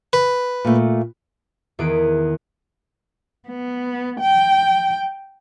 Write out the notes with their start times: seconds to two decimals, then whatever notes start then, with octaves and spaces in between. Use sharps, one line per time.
0.13 B4
0.65 A#2 A3
1.79 E2 D#3 G#4 B4 D7
3.48 B3
4.20 G5